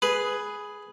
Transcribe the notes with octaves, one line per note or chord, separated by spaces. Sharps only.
G#4 B4